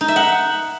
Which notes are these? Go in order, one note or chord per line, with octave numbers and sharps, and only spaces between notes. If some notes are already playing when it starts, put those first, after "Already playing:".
D#4
E5
F#5